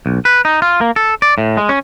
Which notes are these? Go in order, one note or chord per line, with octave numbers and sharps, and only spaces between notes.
B1
B4
D#4
F4
A#3
A4
D5
A2
G#3
C#4